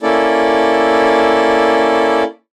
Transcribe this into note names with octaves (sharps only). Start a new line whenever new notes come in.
A#3 C#4 E4 A4 D5